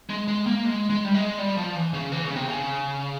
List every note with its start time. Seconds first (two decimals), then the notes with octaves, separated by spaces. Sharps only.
0.10 G#3
0.28 G#3
0.46 A#3
0.65 G#3
0.90 G#3
1.04 G3
1.14 G#3
1.39 G3
1.57 F3
1.76 E3
1.94 C#3
2.12 E3
2.24 C#3
2.36 C3
2.48 C#3